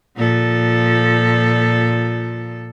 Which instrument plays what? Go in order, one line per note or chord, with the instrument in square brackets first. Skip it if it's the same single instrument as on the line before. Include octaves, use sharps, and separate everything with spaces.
[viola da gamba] A#2 F3 A4